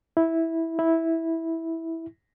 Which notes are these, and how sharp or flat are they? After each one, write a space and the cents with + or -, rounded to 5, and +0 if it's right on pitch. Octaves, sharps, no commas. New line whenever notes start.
E4 -10
E4 -10